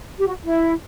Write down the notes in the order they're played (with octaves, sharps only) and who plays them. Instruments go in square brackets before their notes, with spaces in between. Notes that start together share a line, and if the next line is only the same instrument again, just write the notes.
[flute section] G4
F#4
E4